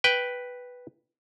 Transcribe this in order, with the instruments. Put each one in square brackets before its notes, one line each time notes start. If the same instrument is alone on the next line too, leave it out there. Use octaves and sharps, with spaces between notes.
[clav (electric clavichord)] B4 G5